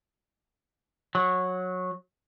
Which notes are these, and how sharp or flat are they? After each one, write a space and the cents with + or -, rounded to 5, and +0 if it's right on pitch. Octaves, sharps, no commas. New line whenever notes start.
F#3 -15